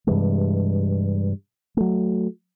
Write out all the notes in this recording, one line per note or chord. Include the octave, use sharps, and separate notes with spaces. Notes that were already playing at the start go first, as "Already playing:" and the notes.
G2 C3 E3 G#3
F#3 A3